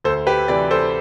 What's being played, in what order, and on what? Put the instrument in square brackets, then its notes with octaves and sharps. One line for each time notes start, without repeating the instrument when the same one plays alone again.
[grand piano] D2 A4 C5
G4 B4
C3 E3 B4 D5
A4 C5